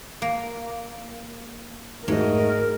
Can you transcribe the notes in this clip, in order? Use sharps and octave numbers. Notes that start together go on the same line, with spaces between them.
A#3
G#2 A3 F#4 A#4 D#5